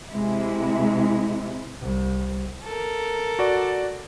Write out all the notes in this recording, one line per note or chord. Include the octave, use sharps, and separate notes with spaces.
C3 G#3 E4
C2
A4 A#4
F#4 D5